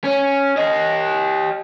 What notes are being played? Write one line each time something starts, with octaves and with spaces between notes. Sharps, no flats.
C#4
G4 D#5